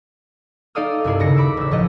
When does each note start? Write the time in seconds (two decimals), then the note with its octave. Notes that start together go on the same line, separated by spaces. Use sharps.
0.75 D#4 A4 D5 F5 D#6 E6
1.04 C2 G2 E4 C7
1.20 D#1 C#3 A#6 C#7
1.37 B5 D6 E6
1.57 A1 E6
1.71 B1 A2 F3 B4 D#5